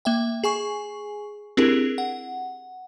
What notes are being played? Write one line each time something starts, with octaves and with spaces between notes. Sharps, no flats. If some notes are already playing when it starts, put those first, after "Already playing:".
A#3 E5 G5
G#4 G#5 C#6
C4 D4 E4 G4 G#4 A#4
F#5